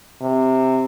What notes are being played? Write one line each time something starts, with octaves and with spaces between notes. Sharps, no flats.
C3